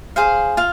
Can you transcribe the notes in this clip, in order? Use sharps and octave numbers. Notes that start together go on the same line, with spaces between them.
G#4 C5 F5
F4 F5